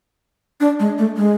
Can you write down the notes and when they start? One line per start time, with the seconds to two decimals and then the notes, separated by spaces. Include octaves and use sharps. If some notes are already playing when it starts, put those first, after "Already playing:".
0.60 D4
0.80 G#3
0.98 A3
1.17 G#3